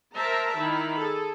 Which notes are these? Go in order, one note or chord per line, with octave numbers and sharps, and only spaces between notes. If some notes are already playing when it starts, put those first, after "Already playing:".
A#4 C5 E5 A5 A#5
D#3 E4 B5
G#4 A4